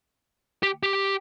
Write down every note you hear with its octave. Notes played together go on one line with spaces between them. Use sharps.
G4
G4